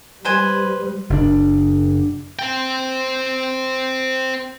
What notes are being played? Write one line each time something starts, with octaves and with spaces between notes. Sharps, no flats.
G3 B4 C5 G#5
F#1 C3 D4
C4 G5